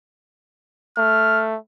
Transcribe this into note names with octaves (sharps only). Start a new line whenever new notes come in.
A3 F6